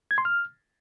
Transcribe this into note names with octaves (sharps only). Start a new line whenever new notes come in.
G#6
C6
F6